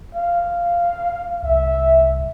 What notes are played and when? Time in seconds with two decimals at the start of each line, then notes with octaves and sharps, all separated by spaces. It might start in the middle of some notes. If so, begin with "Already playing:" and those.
0.15 F5
1.43 C2 E5